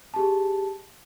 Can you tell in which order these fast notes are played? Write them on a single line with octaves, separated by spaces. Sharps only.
A5 G4 G#4